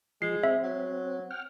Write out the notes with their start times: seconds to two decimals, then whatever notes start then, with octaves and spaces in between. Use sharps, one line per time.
0.22 F3 G#3 C7
0.43 C4 E5
0.63 F#3
1.31 F#5 G5 F6